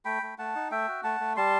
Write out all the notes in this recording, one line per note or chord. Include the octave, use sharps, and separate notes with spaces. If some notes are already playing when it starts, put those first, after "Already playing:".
A3 G5 B5
A3
A3 F#5 A5
D#4
A3 E5 G5
F#4
A3 F#5 A5
A3
G3 A5 C6